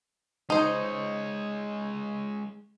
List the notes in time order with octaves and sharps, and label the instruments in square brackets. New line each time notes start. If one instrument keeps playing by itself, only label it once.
[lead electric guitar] G#3 C#5 [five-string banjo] D#4 C5